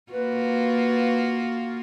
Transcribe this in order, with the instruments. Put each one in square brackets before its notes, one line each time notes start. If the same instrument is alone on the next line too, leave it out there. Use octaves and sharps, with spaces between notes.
[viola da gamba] A#3 F4 F#4 [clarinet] B4